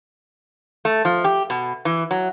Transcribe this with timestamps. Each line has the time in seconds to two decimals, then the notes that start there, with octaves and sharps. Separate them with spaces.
0.85 A3
1.05 F3
1.24 G4
1.50 B2
1.85 E3
2.11 F#3